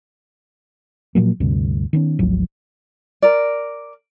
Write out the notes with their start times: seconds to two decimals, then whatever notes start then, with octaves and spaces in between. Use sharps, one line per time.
1.15 A#2 F3 F#3 A#3
1.40 D2 G2 C3
1.93 D#3 B3 C#4
2.19 G#1 D2 F3 F#3
3.22 A#4 D5